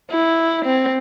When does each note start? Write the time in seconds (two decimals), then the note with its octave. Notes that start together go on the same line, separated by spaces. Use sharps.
0.11 E4
0.65 C4